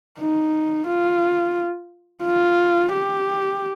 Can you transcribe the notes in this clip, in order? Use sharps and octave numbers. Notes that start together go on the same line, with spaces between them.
D#4
F4
F4
G4